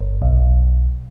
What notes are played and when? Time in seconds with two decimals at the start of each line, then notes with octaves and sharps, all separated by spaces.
0.01 G1
0.22 B1